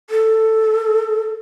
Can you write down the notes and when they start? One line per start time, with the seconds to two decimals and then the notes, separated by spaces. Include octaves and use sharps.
0.10 A4